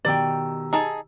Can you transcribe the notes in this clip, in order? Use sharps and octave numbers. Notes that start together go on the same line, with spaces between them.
B2 D#3 G4 D5 G5 A#5 E6
D#4 G#4 A5